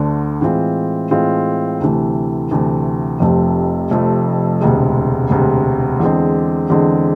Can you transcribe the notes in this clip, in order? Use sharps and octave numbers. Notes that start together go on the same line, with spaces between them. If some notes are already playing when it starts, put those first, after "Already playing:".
Already playing: D2 D3 A3 D4
A2 E3 G#3 C4 F4
A2 E3 G#3 C4 F4
D2 C3 E3 A3
D2 C3 E3 A3
F1 F2 C3 F3 A3
F1 F2 C3 F3 A3
E1 D2 C3 G#3
E1 D2 C3 G#3
E2 D3 G#3 C4
E2 D3 G#3 C4